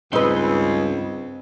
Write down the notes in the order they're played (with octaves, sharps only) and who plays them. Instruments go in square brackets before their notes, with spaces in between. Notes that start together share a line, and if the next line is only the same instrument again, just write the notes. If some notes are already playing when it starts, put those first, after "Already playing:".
[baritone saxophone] C#2 [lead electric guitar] G2 C6 [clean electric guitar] C4 D#5 [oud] D#4 B4